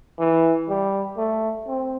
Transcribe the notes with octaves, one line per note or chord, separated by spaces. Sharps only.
E3
G3
A3
C4